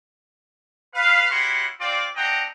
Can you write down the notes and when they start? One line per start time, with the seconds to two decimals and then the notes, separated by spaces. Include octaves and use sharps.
0.95 B4 F5
1.30 C#4 E4 F#4 G4 F#5 C6
1.80 C4 F4 D5
2.16 C4 D4 D#5 F#5 G5 A#5